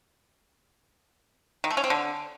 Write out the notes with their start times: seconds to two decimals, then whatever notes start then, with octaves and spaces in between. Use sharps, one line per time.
1.64 D#3
1.71 A3
1.77 C#4
1.84 C4
1.90 D3